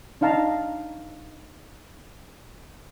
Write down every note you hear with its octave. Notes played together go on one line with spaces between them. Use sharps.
D4 D#4 F5 A5 A#5